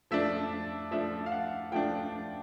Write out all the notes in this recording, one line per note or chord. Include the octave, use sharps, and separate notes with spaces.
F3 A3 D4 E5
F3 A3 D4 E5
F5
F#5
F3 A3 D4 G5